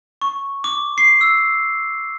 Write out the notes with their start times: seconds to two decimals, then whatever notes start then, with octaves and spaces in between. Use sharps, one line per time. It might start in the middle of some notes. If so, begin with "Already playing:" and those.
0.22 C#6
0.64 D6
0.98 C7
1.21 E6